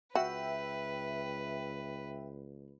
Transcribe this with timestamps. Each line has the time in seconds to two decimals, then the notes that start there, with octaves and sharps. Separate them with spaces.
0.15 C#2 F#4 B4 E5 G5